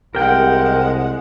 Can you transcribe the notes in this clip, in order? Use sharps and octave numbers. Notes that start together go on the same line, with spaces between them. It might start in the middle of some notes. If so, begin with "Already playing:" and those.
C2 G#3 A#4 F#5 G5